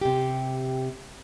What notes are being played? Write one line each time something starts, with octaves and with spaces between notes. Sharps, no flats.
C3 G4